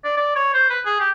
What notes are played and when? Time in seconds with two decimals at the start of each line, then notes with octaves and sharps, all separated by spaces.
0.05 D5
0.17 D5
0.36 C#5
0.54 C5
0.70 B4
0.85 G#4
1.00 G4